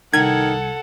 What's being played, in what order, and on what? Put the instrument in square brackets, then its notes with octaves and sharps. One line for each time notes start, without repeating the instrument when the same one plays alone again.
[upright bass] C2 [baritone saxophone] D#3 [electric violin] A4 F#5 [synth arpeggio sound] G#6